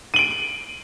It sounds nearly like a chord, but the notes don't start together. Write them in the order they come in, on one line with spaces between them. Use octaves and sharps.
D#7 F#7 D7